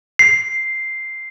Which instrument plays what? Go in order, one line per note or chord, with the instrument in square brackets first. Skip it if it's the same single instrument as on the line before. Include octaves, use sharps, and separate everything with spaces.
[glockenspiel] C7